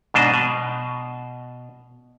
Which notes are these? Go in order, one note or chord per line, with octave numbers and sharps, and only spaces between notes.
G#2 B2 D4 C5 D#5
B2